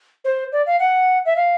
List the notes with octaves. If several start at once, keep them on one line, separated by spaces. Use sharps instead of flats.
C5
D5
F5
F#5
E5
F5